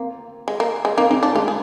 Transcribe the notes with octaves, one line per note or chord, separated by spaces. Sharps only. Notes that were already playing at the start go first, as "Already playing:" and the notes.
Already playing: A#3 C4
G#3
A#3
G#3
A#3 C4
G#3 C4
C4 D4
G#3 F4
G#4